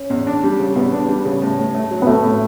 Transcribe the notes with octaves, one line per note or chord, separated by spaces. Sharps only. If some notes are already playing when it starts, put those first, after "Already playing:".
Already playing: C#4
E2
D4
G3
C#3
E2 B3
D4
G3
C#3
A2
A2
A3
F#3
B3
A2 A3
A2